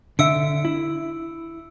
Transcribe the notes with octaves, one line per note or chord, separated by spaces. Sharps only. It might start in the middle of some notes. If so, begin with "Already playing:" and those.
D3 E5 E6 C#7 D7
E4